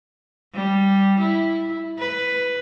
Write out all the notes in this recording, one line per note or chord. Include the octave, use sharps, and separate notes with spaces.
G3
E4
B4